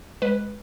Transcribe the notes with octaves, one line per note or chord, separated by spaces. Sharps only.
G#3 B4